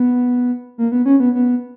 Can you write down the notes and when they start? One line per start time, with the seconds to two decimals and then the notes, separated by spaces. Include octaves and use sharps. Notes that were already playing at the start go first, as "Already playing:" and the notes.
Already playing: B3
0.78 A#3
0.92 B3
1.06 C#4
1.20 B3
1.35 B3